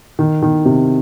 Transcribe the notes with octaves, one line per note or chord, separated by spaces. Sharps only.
D#3
D#3
C3